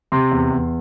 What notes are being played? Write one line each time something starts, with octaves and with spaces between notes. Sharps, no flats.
C3 C6
E2
E2